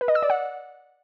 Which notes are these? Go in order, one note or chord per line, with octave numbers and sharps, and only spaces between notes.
B4
D#5
E6
D5
F#5